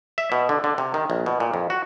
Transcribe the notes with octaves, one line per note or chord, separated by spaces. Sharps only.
E5
B2
D3
D3
C3
D#3
A#1
B2
A#2
F2
F#4